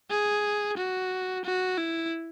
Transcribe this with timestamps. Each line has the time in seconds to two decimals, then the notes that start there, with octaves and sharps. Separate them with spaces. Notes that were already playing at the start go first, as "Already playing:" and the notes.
0.10 G#4
0.77 F#4
1.45 F#4
1.78 E4